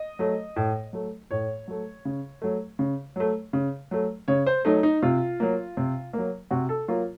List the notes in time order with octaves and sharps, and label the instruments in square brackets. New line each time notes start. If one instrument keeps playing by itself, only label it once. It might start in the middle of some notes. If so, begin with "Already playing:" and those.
Already playing: [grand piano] D#5
F#3 A3
A2
F#3 A3
A2 C#5
F#3 A3
C#3
F#3 A3
C#3
F#3 A3
C#3
F#3 A3
C#3 C#5
C5
F#3 A3 D#4
D#4
C3 F4
F#3 A#3
C3
F#3 A#3
C3 F#4
A4
F#3 A#3 F4